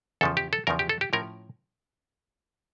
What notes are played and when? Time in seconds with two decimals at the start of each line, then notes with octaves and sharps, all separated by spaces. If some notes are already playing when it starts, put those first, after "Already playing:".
0.21 E2 C#3 F3 A4
0.37 G4
0.53 A4
0.67 E2 C#3 F3 A#4
0.79 G4
0.89 A4
1.01 G4
1.13 A2 F3 C#4 A#4